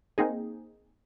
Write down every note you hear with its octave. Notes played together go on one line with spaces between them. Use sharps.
A#3 C4 D#4 G#4